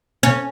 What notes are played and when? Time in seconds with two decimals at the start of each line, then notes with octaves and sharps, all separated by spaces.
0.23 C#4